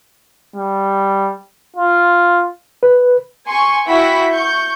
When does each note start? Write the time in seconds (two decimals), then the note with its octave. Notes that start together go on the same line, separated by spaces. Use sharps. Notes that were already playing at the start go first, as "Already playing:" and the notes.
0.56 G3
1.76 F4
2.83 B4
3.47 G#5 C6 C#6
3.87 E4 F#4 E5 G5 B5 B6
4.31 C#6 G6